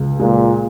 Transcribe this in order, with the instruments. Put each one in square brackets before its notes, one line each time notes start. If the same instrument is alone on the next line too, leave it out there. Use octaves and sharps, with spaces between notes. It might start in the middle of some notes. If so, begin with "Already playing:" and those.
Already playing: [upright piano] C#2
[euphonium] A#2 [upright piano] G#3